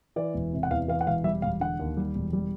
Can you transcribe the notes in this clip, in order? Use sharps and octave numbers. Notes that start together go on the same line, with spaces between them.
E3 D5
E1
C3
F#5
E2 F5
E3 F5
F#5
E1 F5
G3 E5
E1 F5
D3 F#5
D#2
G3
E1
G3